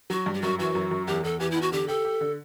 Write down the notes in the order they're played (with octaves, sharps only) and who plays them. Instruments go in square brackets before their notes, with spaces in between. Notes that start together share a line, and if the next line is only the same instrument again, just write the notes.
[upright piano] F#3 [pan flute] F#4
[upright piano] G2
[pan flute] G4
[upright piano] F#2 [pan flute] F#4
[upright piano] E3 [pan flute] F#4
[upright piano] F#2
F#2
[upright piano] E2 [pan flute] G4
[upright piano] E2 [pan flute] A4
[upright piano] E3 [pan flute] G4
[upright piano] E2 [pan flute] E4
[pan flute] F#4
[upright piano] D3 [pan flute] G4
[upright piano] G4 [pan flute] A4
[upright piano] G4
D3